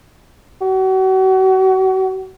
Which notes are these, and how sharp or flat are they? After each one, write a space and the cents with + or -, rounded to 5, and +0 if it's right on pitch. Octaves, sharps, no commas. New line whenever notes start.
F#4 +35